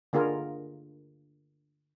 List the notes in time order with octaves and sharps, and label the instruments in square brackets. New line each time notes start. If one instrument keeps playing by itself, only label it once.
[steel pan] D3 A#3 F4 G#4 A#4